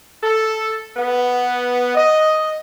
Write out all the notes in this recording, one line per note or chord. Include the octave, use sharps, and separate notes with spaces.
A4
B3
D#5